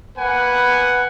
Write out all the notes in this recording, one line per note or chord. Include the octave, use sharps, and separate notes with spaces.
A#3 B4 F#5 G#5